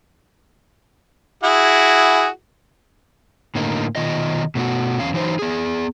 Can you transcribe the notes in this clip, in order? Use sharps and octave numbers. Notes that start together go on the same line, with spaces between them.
E4 F#4 G#4
A2 D3 A#3 D#4
B2 D#3 F4 D#5
B2 A3 F#4
E2 C#4 F5
E3 F#3 D#4 C5
B3 G#4